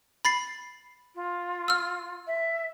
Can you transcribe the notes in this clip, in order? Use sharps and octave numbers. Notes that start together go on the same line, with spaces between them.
B5 A6 C7
F4
E6 F6
E5